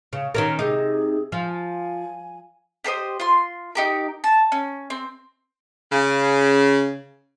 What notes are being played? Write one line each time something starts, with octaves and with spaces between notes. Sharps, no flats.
C#3
D#3 C#4 A#4
C3 D#4 G#4
F3 G#5
G4 A4 C5 D#5
F4 C6
D#4 G4 A#4
A5
C#4
C4
C#3